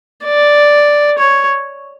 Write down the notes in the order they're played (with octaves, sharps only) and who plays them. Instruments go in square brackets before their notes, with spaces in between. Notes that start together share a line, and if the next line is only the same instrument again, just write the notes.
[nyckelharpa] D5
C#5